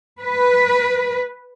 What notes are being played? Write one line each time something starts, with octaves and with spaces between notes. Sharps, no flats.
B4